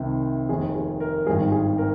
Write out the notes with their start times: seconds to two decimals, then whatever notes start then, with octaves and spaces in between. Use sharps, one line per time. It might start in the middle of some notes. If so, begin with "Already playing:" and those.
Already playing: C2 C3 D#3
0.49 F1 D#2 D#3 G#4
0.75 G#4
1.00 A#4
1.26 G#1 G2 D#3 G#4
1.52 G#4
1.78 A#4